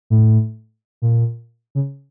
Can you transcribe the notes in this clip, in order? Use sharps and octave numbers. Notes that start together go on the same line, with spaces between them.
A2
A#2
C#3